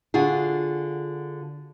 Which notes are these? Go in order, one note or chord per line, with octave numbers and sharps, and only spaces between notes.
D3 F4 F#4 G#4